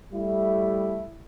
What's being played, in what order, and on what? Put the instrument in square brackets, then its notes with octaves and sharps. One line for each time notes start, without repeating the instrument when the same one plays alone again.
[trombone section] G3 A3 E4